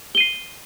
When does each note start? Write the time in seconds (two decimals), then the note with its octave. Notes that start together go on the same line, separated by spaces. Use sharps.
0.15 G7
0.18 D#7
0.20 C7